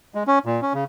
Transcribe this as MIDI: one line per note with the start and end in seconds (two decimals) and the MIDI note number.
0.15 0.23 56
0.27 0.39 61
0.46 0.60 46
0.62 0.73 61
0.74 0.84 49